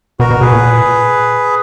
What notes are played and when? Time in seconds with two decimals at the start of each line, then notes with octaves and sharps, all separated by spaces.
0.20 B2 F#4 A#4
0.31 B2
0.41 B2 G#4 B4
0.52 A#2